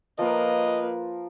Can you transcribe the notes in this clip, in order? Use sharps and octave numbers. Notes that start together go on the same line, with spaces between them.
F3 A#3 A#4 B4 D#5